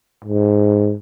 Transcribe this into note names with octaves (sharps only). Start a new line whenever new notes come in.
G#2